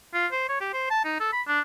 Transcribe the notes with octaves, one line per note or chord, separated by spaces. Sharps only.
F4
C5
C#5
G4
C5
A5
D#4
A4
B5
D4